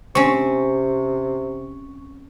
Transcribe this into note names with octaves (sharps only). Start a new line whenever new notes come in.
C3 C4 C#4 C#6